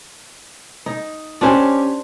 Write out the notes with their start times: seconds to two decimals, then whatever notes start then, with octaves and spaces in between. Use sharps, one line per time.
0.86 D#4
1.41 C#4 D4 G4 C5 G#5